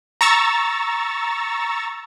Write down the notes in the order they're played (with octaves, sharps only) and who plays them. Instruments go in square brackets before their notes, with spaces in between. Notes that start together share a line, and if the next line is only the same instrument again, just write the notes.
[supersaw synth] A#5 C#6 E6 A6